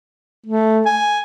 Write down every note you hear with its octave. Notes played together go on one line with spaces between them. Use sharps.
A3
G#5